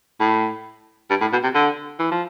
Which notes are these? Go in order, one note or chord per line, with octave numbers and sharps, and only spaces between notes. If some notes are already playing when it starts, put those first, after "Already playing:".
A2
G2
A2
B2
C3
D3
E3
F3